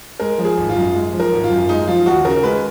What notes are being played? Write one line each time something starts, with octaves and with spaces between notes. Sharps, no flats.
G#3 A#4
F3
G#4
G#1
F4
F#2
G#3
F3
A#4
G#1
F4
F#2
G#3 D#4
F3 F4
D#2 F#4
C#3 A#4
G#3 B4